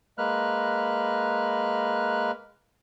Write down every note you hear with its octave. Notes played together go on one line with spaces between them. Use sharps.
G#3 A#3 B4 F6 F#6